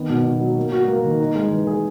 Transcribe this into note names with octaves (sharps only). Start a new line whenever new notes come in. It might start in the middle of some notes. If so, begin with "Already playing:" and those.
Already playing: D#3 B3
B2
B2
F#3
A#3
F#4
A#3
D#3
D#4
G#3
E3
G#4